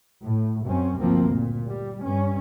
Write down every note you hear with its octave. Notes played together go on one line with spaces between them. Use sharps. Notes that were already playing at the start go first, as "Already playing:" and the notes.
A2
F#2 C4 C#4
G1 D2 F3 A#3 C4
A#2
G3
G2 C#4